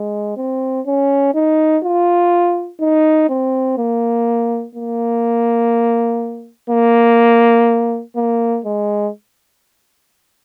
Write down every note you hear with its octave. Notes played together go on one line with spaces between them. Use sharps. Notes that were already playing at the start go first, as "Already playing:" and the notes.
Already playing: G#3
C4
C#4
D#4
F4
D#4
C4
A#3
A#3
A#3
A#3
G#3